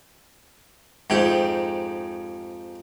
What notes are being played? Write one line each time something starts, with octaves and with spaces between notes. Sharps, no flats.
F2 G#2 G4